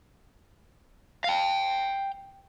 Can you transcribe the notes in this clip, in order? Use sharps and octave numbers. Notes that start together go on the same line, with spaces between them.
F5 G5